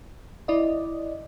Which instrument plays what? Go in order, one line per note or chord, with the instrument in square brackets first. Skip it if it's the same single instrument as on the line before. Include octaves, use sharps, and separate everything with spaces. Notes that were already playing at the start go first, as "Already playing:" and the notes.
[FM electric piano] E4 D5 D#5